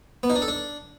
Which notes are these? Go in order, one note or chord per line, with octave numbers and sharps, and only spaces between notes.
B3
D#4
D4
A4
D4